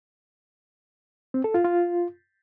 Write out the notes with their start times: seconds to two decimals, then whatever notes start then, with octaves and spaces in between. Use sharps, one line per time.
1.34 C4
1.44 A4
1.54 F4
1.65 F4